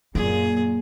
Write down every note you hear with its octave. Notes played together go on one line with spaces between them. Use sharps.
F#2 A#2 A#3 G#4